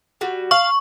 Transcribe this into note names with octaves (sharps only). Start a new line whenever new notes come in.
G3 F#4
F5 C#6